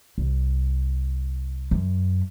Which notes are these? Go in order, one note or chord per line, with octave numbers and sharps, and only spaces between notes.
C2
F#2